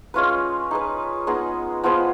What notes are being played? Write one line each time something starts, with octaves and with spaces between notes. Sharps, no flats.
G#3 C#4 F4 B4
D#4 G#4 B4
G#3 B3 D#4 G#4
F3 B3 F4 G#4